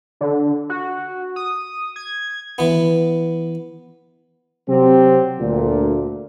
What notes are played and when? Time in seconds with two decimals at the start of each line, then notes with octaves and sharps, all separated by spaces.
0.21 D3
0.69 F#4
1.36 D#6
1.96 G#6
2.58 E3 B3
4.68 C3 F#3 C4 G4
5.40 D2 A#2